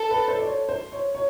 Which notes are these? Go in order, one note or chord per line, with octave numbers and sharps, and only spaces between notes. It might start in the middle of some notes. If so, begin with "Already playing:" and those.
Already playing: A4
B4
C5
D5
C#5
C5
C#5
C#5